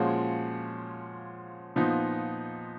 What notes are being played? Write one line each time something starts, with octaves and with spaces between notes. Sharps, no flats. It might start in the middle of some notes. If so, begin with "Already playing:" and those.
Already playing: A#2 F3 G#3 C#4 F#4
A#2 F3 B3 D#4